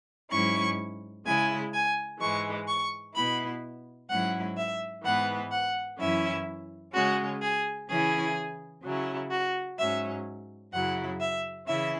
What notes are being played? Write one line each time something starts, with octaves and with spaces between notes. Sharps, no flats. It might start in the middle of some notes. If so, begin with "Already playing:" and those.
G#2 F#3 C#4 E4 C#6
C#3 G#3 E4 G#5
G#5
G#2 E3 G#3 C#6
C#6
B2 B3 E4 B5
G#2 F#3 C#4 E4 F#5
E5
G#2 E3 B3 F#5
F#5
F#2 E3 C#4 E4 E5
C#3 G#3 C#4 F#4
G#4
C#3 E3 C#4 E4 G#4
C#3 F#3 C#4 E4
F#4
G#2 F#3 C#4 E5
F#2 C#3 F#3 E4 F#5
E5
C#3 E3 C#4 E4 E5